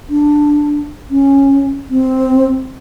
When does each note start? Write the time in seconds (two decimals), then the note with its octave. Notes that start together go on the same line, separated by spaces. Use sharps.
0.10 D4
1.10 C#4
1.90 C4